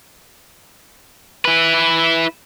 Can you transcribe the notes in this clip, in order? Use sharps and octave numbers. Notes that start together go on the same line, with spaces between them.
E4 B4